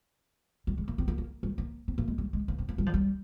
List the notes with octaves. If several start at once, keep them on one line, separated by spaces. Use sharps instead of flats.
G3
G#3
A#3
C4
A#3
A#3
G3
A#3
C4
A#3
G#3
G3
G#3
A#3
C4
A#3
G3
F3
G3